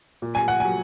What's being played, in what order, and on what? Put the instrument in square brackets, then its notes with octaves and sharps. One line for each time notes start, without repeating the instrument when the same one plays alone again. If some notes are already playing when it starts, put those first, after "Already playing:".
[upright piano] A#2
G#5
F#5
F#3 G#5